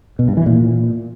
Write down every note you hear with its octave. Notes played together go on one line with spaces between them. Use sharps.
B2
G2
E3
A#2